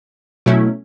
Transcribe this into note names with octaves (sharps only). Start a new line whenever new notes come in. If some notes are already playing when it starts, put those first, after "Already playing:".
B2 F#3 A3 C#4 E4